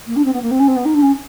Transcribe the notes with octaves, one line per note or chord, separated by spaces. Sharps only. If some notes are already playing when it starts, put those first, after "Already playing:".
A#3
D4
C4
B3
A#3
C4
C#4
C4
B3
D#4
D4
C#4